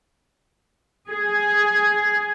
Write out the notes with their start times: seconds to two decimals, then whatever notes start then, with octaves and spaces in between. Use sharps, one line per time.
1.10 G#4